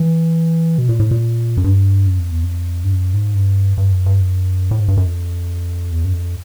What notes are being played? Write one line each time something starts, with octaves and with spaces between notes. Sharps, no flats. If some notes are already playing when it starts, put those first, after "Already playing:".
Already playing: E3
B2
A#2
A2
A#2
F#2
G2
F#2
F2
E2
F2
G2
F#2
G#2
G2
G2
F#2
G2
F#2
A2
G#2
G2
F#2
F2
E2
F#2
F2